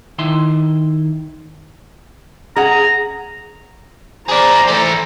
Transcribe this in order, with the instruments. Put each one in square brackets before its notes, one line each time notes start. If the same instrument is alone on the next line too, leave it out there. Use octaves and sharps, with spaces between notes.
[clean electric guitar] D#3 E4 C6
[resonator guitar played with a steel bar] G#4 F#5 [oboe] A#5
[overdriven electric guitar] G#4 D5 [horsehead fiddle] C5 A#5
[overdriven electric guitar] E3 A4